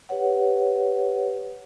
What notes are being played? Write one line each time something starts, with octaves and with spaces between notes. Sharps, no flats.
G4 B4 C#5 F#5